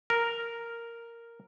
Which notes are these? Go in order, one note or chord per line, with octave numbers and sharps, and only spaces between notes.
A#4